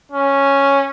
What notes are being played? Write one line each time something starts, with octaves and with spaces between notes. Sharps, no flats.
C#4